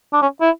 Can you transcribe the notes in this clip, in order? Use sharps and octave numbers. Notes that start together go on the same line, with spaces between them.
D4
C#4
E4